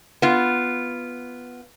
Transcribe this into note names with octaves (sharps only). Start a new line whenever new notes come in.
B3 F4